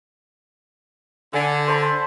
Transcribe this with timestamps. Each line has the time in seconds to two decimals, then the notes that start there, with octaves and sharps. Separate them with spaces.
1.33 D3 G#5
1.68 C5 A5 B5